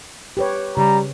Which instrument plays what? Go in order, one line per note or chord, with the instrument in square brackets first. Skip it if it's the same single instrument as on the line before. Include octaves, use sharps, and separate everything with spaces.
[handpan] G4 B4 C#5
[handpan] C#3 [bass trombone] G3 [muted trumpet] A#5